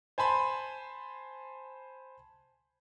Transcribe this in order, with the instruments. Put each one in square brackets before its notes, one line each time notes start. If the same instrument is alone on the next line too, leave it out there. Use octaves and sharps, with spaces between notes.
[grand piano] C5 G#5 A5 B5 C6